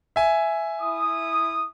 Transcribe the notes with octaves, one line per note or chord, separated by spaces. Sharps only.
E5 G#5
E4 D#6